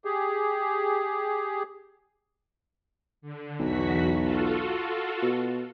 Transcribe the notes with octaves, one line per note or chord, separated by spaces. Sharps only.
G4 G#4
D3
B1 E2 F#4 B6
F4 F#4 A4
B2